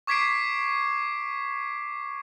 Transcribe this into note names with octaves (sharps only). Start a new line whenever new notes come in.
C#6 D6 G#6 B6 C7 D7